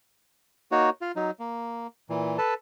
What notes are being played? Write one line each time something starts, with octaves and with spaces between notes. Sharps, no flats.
A#3 D#4 F#4 C#5
F4
F#3 D#4
A#3
A#2 E3
A4 B4 A5